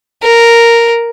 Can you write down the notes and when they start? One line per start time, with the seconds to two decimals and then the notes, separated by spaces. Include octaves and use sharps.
0.23 A#4